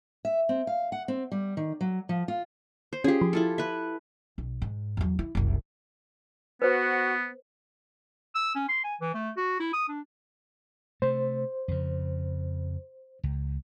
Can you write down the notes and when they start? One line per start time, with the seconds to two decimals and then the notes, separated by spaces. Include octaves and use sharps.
0.25 E5
0.49 C4
0.67 F5
0.92 F#5
1.08 C4
1.32 G3
1.57 D#3
1.81 F#3
2.09 F3
2.28 F4
2.93 C5
3.04 C#4 F4 G4 G#4
3.21 F3
3.33 E4 F4 A4
3.58 B4 E5
4.38 B1
4.62 G#2
4.97 E2 F#3
5.19 E4
5.35 F#1 C2
6.62 B3 F#4 B4 C5
8.35 E6
8.55 C#4
8.69 C6
8.84 G#5
9.00 E3
9.14 A3
9.37 F#4
9.60 E4
9.73 D#6
9.88 D4
11.02 C3 A3 C5
11.68 F2 C#3
13.24 C#2